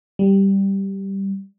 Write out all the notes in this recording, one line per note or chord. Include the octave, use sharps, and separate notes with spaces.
G3